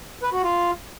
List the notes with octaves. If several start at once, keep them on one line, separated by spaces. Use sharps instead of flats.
B4
F#4
F4